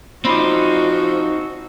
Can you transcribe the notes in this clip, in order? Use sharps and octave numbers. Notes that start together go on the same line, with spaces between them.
F3 C4 D#4 F#4 D5 B5 C6